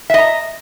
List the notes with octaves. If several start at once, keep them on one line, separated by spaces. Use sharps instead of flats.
D#5 E5 A#5